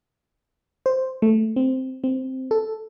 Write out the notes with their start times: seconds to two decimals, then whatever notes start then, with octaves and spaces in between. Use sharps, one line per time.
0.86 C5
1.22 A3
1.56 C4
2.04 C4
2.51 A4